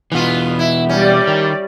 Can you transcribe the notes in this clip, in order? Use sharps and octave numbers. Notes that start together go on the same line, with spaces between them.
G2 B2 E3 B3 F4
E4
G3 C#4 D5
D#3